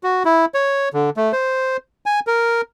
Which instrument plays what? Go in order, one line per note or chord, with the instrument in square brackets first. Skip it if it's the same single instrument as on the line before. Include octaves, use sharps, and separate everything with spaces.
[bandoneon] F#4
E4
C#5
D3
A3
C5
G#5
A#4